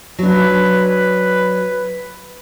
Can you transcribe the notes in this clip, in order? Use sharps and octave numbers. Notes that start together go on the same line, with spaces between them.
F#3 D4 B4